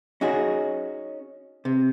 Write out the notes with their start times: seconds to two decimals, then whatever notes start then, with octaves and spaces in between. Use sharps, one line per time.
0.21 C#4 D#4 F#4 G#4
1.65 C3